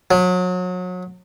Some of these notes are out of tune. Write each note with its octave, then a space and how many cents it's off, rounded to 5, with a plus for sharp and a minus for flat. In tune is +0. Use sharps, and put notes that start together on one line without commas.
F#3 -30